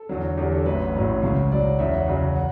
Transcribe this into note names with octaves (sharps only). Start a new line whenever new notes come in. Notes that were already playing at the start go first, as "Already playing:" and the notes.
Already playing: A4
E2 D3 F#3
E2 D3 F#3 G4
A4
A1 A2 F#3 B4
A1 A2 F#3
C#2 C#3 F#3
C#2 C#3 F#3 D5
F#5
E2 C#3 F#3 E5
F#5
E2 C#3 F#3
F#5